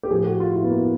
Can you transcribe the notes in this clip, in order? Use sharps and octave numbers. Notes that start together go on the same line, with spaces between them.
G4
A2 F3 G#4
F#4
F4
E4
B3
A#3